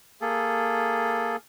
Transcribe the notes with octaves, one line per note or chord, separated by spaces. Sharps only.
A#3 G#4 A4